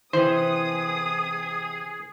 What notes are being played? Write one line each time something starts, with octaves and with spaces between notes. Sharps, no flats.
C3 E3 G#4 C5 D#6